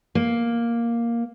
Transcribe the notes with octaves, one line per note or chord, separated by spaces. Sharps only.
A#3